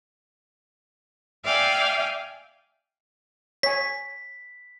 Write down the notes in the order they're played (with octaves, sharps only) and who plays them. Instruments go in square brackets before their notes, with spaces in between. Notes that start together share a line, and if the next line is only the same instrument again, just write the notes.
[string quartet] D5 E5 F5 G5 G#5
[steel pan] C#5 G#5 [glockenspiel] B6